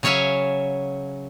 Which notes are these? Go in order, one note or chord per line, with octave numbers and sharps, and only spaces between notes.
C#3 F#3 C#5 E5 F5 G#5